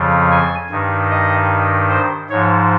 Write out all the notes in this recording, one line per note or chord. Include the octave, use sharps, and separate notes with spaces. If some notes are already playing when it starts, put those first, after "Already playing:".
Already playing: F2 C#3 F3
G#5
G2 D#3
D#5
C5
G#2 F3 C#5